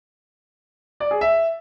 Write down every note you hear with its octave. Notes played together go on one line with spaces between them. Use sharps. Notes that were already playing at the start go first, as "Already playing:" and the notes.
D5
G#4
E5